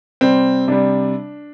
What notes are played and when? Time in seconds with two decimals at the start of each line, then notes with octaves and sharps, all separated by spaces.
0.21 C3 G3 C4
0.68 C3 G3 D4